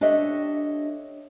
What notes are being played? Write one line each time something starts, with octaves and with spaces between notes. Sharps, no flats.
D4 G4 A4 C#5 D#5 E5